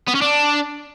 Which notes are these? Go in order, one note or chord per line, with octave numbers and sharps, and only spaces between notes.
B3
C#4
D4